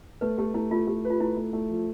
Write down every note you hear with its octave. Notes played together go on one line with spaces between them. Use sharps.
A3 B4
A3 G4
A3 E4
A3 F4
A3 G4
B4
F4
A3 E4
A3
A3
F3